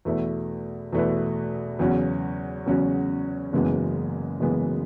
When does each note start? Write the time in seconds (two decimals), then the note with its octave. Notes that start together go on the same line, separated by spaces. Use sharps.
0.05 E2 B2 A3 E4 B4
0.93 E2 B2 A3 E4 B4
1.79 E2 C#3 F#3 C#4 F#4
2.66 E2 C#3 F#3 C#4 F#4
3.53 F#1 F#2 E3 G#3 B3
4.40 F#1 F#2 E3 G#3 B3